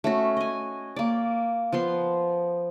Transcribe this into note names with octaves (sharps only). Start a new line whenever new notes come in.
A3 C#4 F#4
D#5 G#5
A#3 D5
F3 B3 C6